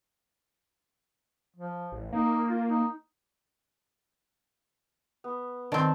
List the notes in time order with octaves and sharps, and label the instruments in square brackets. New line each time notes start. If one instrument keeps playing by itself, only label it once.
[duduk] F3
[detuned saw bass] A1
[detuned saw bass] A#3 [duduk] D#4
[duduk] F4
D#4
[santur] B3
[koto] D#3 C4 [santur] D5 A5 C#6